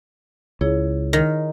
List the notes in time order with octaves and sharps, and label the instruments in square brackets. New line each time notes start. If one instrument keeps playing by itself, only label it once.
[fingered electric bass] C#2 [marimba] E4 G#4 C#5
[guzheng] D#3